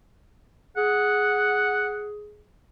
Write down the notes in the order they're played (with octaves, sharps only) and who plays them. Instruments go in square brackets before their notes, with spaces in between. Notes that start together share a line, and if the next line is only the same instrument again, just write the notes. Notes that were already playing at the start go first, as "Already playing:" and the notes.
[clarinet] G#4 [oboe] F#5